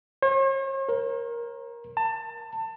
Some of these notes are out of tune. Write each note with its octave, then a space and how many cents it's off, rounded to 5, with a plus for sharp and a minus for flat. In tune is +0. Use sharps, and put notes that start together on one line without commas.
C#5 -45
A#4 +15
A5 +25